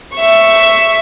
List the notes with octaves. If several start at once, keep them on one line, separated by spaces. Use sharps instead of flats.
E5 C#6